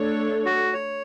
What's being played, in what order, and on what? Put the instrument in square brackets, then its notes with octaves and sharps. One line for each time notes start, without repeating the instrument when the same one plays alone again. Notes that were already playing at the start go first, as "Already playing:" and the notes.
Already playing: [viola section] A3 D4 A4 C#5
[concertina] F#4
C#5